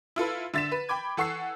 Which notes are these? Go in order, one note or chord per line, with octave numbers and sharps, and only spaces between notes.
E4 F4 A4 B4
D3 E5 A6 B6 E7
B4
G5 B5 D6 G#6
E3 A4 F#5 C#6 E6 C7